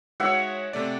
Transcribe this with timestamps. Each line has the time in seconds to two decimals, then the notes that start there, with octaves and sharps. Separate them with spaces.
0.20 G#3 F#4 C#5 E5 F#5
0.73 C3 A3 D5